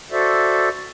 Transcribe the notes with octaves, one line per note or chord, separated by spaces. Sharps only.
F#4 A4 C5 D5 E5